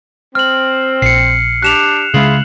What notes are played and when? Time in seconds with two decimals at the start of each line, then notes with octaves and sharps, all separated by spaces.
0.35 C4 F6 F#7
1.02 A#1 C7 C#7
1.63 D4 G4 F#6 E7 F7
2.14 C#3 G#3 E4 F4 G#4 F#7